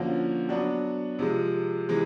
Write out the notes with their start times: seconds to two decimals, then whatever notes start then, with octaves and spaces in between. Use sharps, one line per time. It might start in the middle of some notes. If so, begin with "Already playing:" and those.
Already playing: D3 F3 A#3 C#4 F#4
0.49 F#3 B3 D4 F#4
1.19 C3 F3 G#3
1.89 C3 E3 G#3